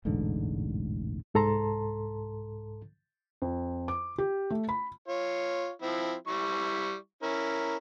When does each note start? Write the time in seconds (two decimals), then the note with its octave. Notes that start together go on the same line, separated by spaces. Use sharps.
0.05 E1 A1 G#2 D3
1.34 C2 G#2 A4 A5 A#5 C6
3.42 F2
3.88 D6
4.18 G4
4.51 A3
4.69 B5
5.08 F4 C#5
5.82 F3 C4 E4
6.28 G3 E4 C#6
7.23 C#4 E4 A#4